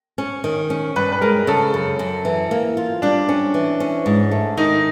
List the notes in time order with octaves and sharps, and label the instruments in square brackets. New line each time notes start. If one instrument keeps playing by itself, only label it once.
[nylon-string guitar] C#4
D#3
C#4
[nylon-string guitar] G2 [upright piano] B4
[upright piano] B4
[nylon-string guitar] G#3 [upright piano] A#4
[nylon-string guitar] C#3 [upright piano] A4
[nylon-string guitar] F#2
F#2
E3
A#3
F4
[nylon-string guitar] G3 [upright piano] D4
[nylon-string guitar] C#4
E3
C#4
G#2
A3
[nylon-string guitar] D#3 [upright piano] D#4